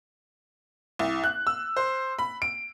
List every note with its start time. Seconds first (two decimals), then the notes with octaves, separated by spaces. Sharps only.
0.99 C2
1.24 F#6
1.47 E6
1.77 C5
2.19 B5
2.42 D7